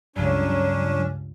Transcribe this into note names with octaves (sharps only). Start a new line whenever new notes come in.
C#2 G2 F#3 C#4 D4